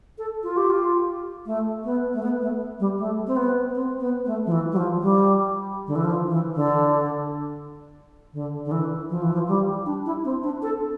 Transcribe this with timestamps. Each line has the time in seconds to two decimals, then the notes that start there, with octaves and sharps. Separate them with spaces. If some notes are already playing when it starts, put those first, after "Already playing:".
0.18 A4
0.44 F4
0.57 G4
0.70 F4
1.46 A3
1.84 B3
2.14 A3
2.22 B3
2.41 A3
2.80 G3
2.99 A3
3.27 C4
3.37 B3
3.75 C4
4.00 B3
4.26 A3
4.46 F3
4.52 E3
4.72 G3
4.77 F3
5.02 G3
5.87 D3
5.95 E3
6.04 F3
6.30 E3
6.55 D3
8.33 D3
8.65 D3
8.72 E3
9.10 F3
9.22 E3
9.34 F3
9.48 G3
9.86 D4
10.06 E4
10.24 C4
10.43 D4
10.62 A4